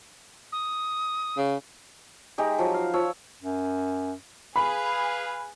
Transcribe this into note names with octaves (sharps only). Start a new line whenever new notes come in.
D#6
C#3
G#3 D#4 G4
F3 F#3
F5
F3 C#5 E6
F#2
G#4 B4 F5 B5